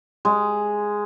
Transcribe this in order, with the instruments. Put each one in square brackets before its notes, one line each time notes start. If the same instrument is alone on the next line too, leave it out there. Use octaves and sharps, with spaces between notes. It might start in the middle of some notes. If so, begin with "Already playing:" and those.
[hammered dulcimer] G#3